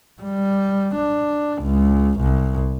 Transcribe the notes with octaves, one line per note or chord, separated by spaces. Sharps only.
G3
D4
C#2
C2